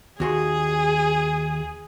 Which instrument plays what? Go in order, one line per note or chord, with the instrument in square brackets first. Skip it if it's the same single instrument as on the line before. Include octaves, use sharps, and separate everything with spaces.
[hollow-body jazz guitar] D#2 F#4 C6 [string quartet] G#4